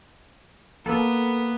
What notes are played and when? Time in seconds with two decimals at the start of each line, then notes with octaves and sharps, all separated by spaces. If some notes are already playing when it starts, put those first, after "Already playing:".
0.86 A#3 B3 A4